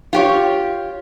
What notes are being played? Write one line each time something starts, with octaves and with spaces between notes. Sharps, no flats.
F4 G4 C#5